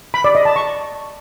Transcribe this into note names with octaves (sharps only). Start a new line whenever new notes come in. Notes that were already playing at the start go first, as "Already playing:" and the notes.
B5
D5
D#5
A5
C#6